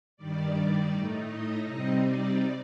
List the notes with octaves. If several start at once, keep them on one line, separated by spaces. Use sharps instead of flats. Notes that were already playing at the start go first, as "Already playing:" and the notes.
G2 D#3 G3 D5
A2 A3 D#4
D#5
C3 G3 C4 D#4 D#5
D5